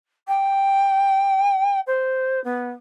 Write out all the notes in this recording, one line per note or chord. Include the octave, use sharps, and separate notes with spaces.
G5
C5
B3